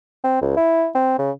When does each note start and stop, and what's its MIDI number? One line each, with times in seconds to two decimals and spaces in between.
0.24 0.41 60
0.42 0.55 37
0.57 0.89 64
0.95 1.17 60
1.18 1.31 49